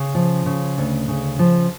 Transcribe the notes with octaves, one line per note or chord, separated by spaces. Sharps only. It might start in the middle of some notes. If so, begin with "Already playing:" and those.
Already playing: C#3
F3
C#3
D2
C#3
F3